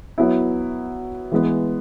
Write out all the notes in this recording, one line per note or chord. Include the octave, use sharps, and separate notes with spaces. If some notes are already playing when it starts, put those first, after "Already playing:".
F#3 B3 E4
E3 G#3 B3